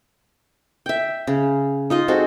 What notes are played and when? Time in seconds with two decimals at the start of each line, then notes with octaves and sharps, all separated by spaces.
0.86 E5 G5
1.27 C#3
1.90 D#4 F4 D#5
2.08 G#3 C4 F#4 A4